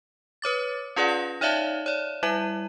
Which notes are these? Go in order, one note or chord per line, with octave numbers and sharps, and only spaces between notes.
B4 C#5 D6 A6
C#4 F4 G#4 B4 D5 F#5
A#6
D#4 C#5 D5 E5 F5 A5
C#5 D5
G3 E4 E5 D#7